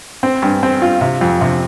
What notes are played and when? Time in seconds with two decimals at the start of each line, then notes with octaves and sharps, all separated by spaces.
0.23 C4
0.42 G2
0.63 C4
0.82 F4
1.01 C3
1.21 F2
1.41 C3